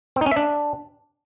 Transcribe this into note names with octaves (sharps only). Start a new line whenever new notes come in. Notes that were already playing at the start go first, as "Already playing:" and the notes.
C4
D#4
C#4
E5
D4